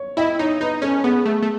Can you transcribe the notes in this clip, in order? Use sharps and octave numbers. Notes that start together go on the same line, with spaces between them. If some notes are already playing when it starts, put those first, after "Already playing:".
Already playing: C#5
E4 D#5
D#4 C#5
D#4 B4
C#4 A4
B3 G#4
A3
A3